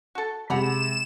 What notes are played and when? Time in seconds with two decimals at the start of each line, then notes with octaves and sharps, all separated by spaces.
0.15 F#4 A4
0.50 C3 G#3 F#5 A#5 B5 E7